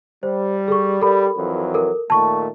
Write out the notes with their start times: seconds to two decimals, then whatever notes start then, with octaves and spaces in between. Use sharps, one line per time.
0.23 G3 C5
0.68 G#4 A4 C#6
1.02 G3 A4 A#4 B5
1.36 F2 E3 F#3
1.74 A4 A#4
2.10 A#2 D#3 A3 A5 C#6